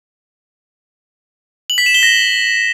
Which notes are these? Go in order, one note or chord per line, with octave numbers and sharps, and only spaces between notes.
F#7
B6
E7
G7
A#6